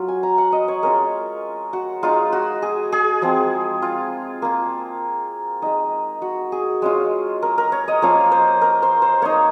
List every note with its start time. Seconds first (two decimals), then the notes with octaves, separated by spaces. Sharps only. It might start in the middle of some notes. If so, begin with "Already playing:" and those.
Already playing: F#3 F4
0.08 G#5
0.23 A#5
0.38 F#5
0.52 D#5
0.68 C#5
0.83 G#3 C#4 F4 A#4
1.73 F#4
2.03 G#3 D#4 F4
2.32 F#4
2.62 G#4
2.92 G#4
3.22 F3 G#3 C4
3.82 F4
4.42 A#3 F4
5.62 G#3 D#4
6.22 F#4
6.52 G#4
6.82 G#3 C#4 F4
7.42 A#4
7.58 A#4
7.72 C#5
7.88 D#5
8.02 F3 A#3 C#4 F4 C#5
8.32 C5
8.62 A#4
8.82 C5
9.02 C5
9.22 A#3 D#4 C#5